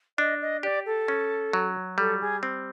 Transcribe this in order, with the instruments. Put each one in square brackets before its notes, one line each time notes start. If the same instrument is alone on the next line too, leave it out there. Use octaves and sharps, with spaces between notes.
[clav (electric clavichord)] D4 [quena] D#5
[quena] D#5
[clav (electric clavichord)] G4 [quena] D5
[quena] A4
[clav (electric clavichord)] C#4
F#3
[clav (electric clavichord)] G3 [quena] A4
[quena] G#4
[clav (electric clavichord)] C4